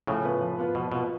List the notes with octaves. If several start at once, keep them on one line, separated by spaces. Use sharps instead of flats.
A2 C#3 F3
B3 F4 B4
F3
B3 F4 B4
B2 F3
B2 B3 F4 B4